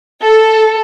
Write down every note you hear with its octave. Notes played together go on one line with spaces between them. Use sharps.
A4